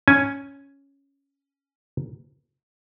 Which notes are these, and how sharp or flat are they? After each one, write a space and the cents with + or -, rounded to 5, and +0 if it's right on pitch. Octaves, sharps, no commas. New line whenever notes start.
C#4 +0 G#5 +0